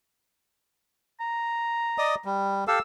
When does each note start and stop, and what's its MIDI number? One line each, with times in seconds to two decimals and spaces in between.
1.20 2.29 82
1.98 2.15 74
1.98 2.15 75
1.98 2.15 87
2.25 2.64 55
2.68 2.79 67
2.68 2.79 69
2.68 2.79 77
2.68 2.81 88